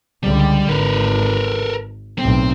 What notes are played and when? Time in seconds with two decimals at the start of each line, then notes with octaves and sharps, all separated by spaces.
0.23 C#2 D3 G3
0.69 G#1 A#4 B4
2.19 B1 A2 C4